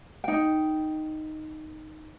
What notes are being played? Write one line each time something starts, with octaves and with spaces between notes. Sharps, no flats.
D#4 G5